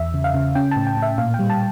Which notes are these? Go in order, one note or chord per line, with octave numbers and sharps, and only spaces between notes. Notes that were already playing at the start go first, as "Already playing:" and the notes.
Already playing: E2 E5
C#3
F5
C#3
C#4 G5
A5
A2
G5
A2
E5
A#2 F5
G5
G3
A5